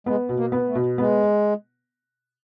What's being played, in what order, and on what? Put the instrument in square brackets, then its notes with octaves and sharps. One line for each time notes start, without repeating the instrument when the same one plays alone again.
[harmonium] G#3 [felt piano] B3
[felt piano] B2
[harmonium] A#3
[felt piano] B3
[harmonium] A3
[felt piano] B2
[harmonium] G#3 [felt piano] B3